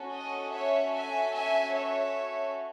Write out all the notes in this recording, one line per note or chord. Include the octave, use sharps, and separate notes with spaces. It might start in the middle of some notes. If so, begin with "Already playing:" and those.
Already playing: C#4 F#4 A4
D#5
C#5 E5
E5 G#5
E5 G#5
C#5 E5